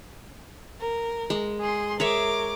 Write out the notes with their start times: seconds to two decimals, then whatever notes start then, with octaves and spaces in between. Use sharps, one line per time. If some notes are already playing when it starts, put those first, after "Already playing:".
0.81 A#4
1.30 G#3
1.61 G#4 C6
2.00 G#4 A#4 C#5 E5 D6